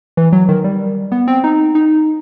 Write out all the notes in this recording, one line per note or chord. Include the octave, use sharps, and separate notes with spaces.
E3
F#3
D#3
G3
B3
C4
D#4
D#4